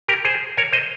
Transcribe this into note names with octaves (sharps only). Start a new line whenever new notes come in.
G4 A#4
G#4 C5
A#4 C#5
C5 D#5